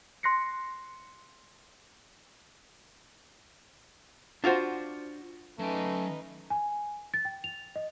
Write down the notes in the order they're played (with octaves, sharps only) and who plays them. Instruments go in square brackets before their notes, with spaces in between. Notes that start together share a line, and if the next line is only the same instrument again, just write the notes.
[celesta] C6 F#6 A#6 C7 C#7
[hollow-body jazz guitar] D4 F4 F#4 C5
[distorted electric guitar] F#3 G5 [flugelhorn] A3 [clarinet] C#4 [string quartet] D#4 B4
[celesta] G#5
A6
G5
F7
D#5